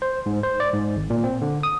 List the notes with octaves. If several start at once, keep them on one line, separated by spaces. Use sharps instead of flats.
C5
G#2
C5
D5
G#2
G#1
A#2
C4
D3
D#6